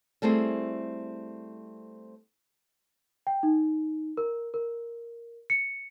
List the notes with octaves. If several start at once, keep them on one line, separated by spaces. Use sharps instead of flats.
G3 A3 C4 E4 G#4
G5
D#4
A#4
A#4
C#7